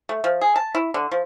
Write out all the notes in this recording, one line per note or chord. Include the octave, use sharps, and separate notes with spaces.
A3
F3
G#4
A5
E4
D3
F3